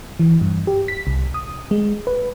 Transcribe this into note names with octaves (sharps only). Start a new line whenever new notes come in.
E3
G2
G4
B6
C2
D#6
G#3
B4